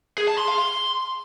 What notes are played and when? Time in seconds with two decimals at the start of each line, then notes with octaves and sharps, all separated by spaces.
0.18 G#4
0.28 A5
0.38 C6
0.48 F5
0.58 C6